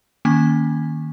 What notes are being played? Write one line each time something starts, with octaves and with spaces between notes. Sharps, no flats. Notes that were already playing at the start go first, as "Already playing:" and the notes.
D#3 A#3 C#4 G#5